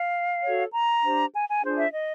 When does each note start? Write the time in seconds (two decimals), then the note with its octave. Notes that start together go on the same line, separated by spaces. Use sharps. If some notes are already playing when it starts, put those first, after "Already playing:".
Already playing: F5
0.42 F#4 A4 C#5
0.72 A#5
1.02 D4 G4 C5
1.33 G#5
1.48 G#5
1.62 D4 F4 G#4 C5
1.77 E5
1.92 D#5